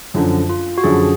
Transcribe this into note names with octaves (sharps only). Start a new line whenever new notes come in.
F#2 D3 F3
F4
F#4
F#2 D3 F3 G#4